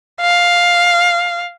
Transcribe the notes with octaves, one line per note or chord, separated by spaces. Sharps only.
F5